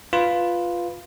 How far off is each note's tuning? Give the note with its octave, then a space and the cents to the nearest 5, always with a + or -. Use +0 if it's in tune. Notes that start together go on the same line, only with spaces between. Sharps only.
F4 +0 B4 +0